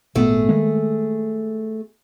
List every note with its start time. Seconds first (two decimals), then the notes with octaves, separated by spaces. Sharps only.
0.15 G#1 A#2 A3 B3 G#4
0.49 D#3 G#3 A#3